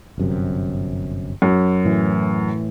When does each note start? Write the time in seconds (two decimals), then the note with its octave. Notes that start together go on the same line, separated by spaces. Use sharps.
0.18 G1 F#2 C3
1.42 F#2
1.85 A2 E3